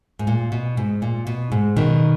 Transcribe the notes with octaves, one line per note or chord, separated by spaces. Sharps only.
G#2
A#2
B2
G#2
A#2
B2
G#2
B2 D#3